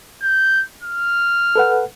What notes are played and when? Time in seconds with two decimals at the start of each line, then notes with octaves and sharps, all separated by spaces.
0.23 G6
0.83 F6
1.56 A4 B4 F#5